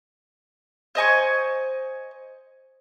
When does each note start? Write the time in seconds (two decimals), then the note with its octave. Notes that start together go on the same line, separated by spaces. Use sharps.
0.95 C5 D#5 G#5 C#6